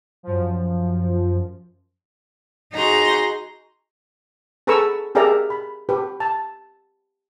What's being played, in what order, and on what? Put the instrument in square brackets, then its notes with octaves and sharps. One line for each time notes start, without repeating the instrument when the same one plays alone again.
[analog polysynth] F#2 F3
[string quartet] D#4 F#4 G#4 A#5 C6
[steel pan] G#4 A4 B4 A#5 C#6 E6
G4 G#4 A#4 D5 E5 A#5
B5
G4 B4
A5